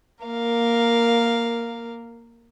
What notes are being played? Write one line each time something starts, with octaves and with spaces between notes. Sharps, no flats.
A#3 A#4 F5